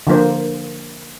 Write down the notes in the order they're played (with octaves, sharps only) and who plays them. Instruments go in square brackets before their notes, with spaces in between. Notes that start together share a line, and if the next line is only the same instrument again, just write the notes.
[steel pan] D3 F3 A#3 C5